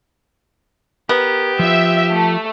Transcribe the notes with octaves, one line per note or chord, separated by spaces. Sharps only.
B3 G4 A#4
F3 F4 E5
A3